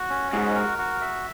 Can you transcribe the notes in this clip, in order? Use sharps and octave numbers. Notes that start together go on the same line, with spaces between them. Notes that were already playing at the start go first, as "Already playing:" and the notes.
Already playing: F#4
C#4
G#2 F#4
A#4
F#4
E5